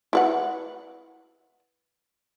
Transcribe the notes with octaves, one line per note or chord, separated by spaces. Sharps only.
E4 B4 F#5